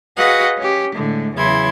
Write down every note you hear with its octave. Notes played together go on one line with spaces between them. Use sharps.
F#4 G#4 B4 D#5 F5 F#5
C#4 G4
A2 D3 G#3
E2 C#3 F#3 E4 C6 G#6